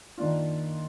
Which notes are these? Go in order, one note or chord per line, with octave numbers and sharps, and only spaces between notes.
D#3 A#3 D4 F4